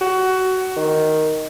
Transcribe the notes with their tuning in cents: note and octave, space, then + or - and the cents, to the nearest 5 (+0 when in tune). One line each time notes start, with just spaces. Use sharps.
F#4 +20
D#3 +0